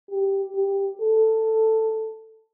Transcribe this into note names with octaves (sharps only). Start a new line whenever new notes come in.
G4
G4
A4